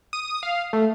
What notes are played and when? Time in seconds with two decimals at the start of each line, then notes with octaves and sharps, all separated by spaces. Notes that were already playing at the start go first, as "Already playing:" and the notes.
0.13 D#6
0.43 F5
0.73 A3